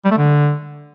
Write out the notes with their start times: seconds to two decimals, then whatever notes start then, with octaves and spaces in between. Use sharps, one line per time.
0.05 G3
0.11 A3
0.17 D3